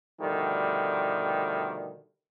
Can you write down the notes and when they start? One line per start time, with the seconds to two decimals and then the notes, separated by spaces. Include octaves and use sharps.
0.21 B2 D3 D#3 F3 G3 A3